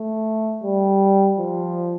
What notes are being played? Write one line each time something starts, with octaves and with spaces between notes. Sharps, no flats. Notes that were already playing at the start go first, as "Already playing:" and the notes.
Already playing: A3
G3
F3